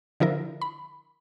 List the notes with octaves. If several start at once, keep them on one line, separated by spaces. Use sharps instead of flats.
D3 F3 E4 A#4
B5